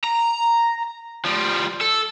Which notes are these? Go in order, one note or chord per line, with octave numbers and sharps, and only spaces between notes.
A#5
F3 G3
A4